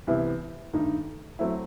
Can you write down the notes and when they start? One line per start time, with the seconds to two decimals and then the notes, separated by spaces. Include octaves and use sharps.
0.07 C2 C3 E3 B3 E4
0.73 G2 D#3 A3 D#4
1.39 F#3 A3 C4 E4